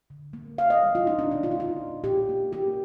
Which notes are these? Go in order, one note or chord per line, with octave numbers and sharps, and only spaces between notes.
D3
A#3
A#3 F5
D#5
G3
F4
A#3 D#4
D4
A#2 D#4
F4
D#4
A#3 F4
A#2
A#2 G4
A#3
A#3 G4